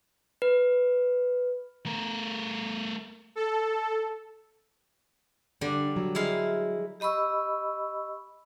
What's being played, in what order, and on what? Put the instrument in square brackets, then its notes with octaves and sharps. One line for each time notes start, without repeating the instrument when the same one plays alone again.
[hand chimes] B4
[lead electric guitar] A3 A#4
[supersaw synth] A4
[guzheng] D3 G3 [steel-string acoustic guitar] D4
[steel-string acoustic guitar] F#3
[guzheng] G#3 E4 F5
[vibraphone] G4 D#5 B5 C#6 E6